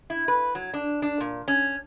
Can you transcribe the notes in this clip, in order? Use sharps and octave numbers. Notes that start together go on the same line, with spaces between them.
E4
B4
F#3
D4
D4
A#2
C#4